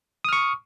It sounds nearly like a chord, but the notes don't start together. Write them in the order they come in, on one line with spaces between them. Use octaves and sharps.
D#6 F6 C#6